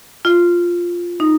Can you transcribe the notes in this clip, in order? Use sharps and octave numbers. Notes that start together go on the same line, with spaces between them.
F4
D#4